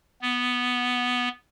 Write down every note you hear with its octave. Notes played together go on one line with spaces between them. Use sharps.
B3